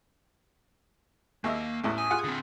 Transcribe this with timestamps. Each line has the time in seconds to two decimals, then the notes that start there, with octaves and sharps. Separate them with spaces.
1.44 D#2 A#3 D#4 E5
1.84 A1 E2 A2
1.98 G#5 D#6
2.10 F4 G#4 F#5
2.24 D3 C4